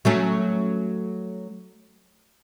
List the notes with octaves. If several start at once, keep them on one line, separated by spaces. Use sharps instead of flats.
F#3 A3 C#4